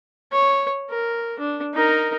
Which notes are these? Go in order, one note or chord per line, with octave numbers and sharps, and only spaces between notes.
C#5
A#4
D4
D#4 A#4